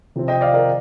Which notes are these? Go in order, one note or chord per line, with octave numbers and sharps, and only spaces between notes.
C3 F3 C4
D#5 G5
D5 F5
A#4 D5